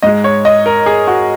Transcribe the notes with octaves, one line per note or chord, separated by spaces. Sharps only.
G#2 G#3 D#5
C#5
D#5
A#4
G#4
F#4